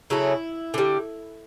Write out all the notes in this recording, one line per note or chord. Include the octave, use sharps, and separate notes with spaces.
C#3 F#3 A3 E4
D3 G3